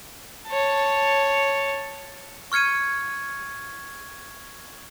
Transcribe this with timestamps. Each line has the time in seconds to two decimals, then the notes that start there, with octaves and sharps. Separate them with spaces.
0.48 C#5 A5
2.52 C#6 F6 G#6 C#7 D#7